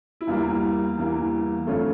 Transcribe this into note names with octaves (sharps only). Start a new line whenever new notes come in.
E4
E2 E3 G3 A#3 F4
E2 E3 G3 A#3
F2 D3 A3 C#4 F4